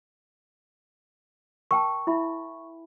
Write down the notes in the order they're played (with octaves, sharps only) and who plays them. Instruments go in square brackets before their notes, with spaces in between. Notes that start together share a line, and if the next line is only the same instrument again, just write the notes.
[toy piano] A#4 G5 A5 [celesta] C#6
[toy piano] E4 E5 B5